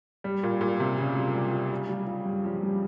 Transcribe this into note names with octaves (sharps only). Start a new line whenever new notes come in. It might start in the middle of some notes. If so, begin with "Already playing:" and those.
G2 G3
A#2 F4
A#2 G3
C3 C#4
C#3 G3
G3
G3
F4
F4
G3
F4
G2
F3 G3
G3